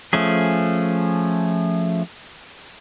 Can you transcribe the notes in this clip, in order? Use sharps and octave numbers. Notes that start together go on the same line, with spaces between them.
F3 A3 C#4 G#4